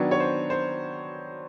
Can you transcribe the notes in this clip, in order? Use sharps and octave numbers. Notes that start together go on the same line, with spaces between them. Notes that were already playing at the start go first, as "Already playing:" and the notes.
Already playing: D#3 F#3 B3 D4 C#5
C#5
C5
C5